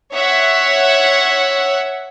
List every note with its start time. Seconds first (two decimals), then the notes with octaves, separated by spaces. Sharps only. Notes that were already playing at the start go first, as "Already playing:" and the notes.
0.13 C#5 E5 F#5